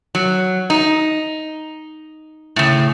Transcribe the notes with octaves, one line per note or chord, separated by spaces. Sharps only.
F#3
D#4
A2 C#3